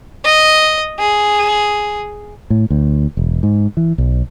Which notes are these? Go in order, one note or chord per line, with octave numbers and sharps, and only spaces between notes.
D#5
G#4
A2
D2
E1
G#2
E3
B1